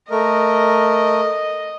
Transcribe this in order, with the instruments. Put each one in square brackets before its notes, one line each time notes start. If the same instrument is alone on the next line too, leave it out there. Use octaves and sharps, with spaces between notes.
[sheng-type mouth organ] A3 A#4 [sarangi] D#5